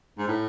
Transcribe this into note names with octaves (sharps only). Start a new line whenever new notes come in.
G#2
A2